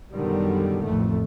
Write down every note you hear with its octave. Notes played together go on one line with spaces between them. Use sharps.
F#2 B2 D3 D#3 G3
A1 F2 A3